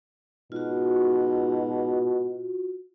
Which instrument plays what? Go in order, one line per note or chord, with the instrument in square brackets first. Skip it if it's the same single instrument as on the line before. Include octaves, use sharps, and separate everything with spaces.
[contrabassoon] G#2 [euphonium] B2 [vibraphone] F4 F#4